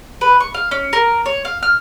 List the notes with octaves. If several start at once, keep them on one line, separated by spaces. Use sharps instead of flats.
B4
C#6
F5
C#4
A#4
C#5
F5
F6